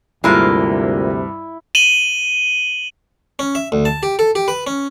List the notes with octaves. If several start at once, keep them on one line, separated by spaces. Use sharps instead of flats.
D2 G2 C3 G#3 A#3 E4 F4
D#7 E7 F#7 G7
C#4
E5
D2
A5
G4
A4
G4
B4
C#4